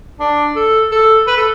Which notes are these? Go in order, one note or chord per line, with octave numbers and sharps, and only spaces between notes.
D4
A4
A4
B4
A4